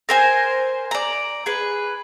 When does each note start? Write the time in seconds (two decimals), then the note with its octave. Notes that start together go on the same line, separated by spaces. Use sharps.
0.09 A#4 C5 G#5
0.91 D5 A#5
1.46 G#4 B4